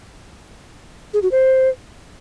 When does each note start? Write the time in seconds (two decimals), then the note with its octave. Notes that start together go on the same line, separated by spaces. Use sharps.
1.14 G#4
1.23 F#4
1.32 C5